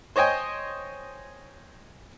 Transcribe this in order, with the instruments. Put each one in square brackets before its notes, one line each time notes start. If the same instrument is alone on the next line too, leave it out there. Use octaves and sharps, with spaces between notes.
[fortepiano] C5 C#5 D#5 G5 G#5